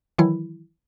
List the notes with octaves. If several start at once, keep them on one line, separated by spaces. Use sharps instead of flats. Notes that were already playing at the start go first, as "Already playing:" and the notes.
D#3 E3 F#3 E4